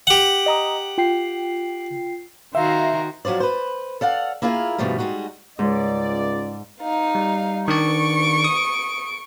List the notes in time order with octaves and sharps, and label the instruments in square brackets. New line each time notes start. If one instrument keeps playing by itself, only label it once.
[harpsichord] G4 F#5
[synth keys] D#5 A#5 D#6
F4 G5 C7
[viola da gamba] D#3 F#4 [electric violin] C5 A#5 [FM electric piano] E5 [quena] F5
[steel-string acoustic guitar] F3 F#3 C#4 C5 D5
B4 C5
A4 D5 F5 F#5
A#3 E4 F4 G#4 A#4
G2 B2 D#3 F3 G3 A3
G3 G#3 D#4 F#4
[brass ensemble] C#2 D5 [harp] G#2
[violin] D#4 F5
[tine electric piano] G3
[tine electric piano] D#3 D4 D5 [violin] C#6 D7
[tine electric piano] D#6